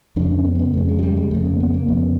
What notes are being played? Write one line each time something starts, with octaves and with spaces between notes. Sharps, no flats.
F2 C#3 D4
C#4
B3
C4
B3
F2 C#3 A3
G#3
F#3
G3
G#3
F2 C#3 A3
A#3
B3
A#3
F2 C#3 B3